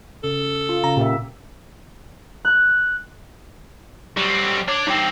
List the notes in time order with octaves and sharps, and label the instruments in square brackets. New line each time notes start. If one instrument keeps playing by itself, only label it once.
[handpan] C#3 [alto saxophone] A4
[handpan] F4
[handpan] C#3 [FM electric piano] A#5
[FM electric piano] A#2 [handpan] G4 A#4 E5
[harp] F#6
[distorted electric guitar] F#3 C4 [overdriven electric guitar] G3
[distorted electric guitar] D4 D5 [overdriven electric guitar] C#5
[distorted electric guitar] G2 C4 [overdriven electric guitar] D#4 G5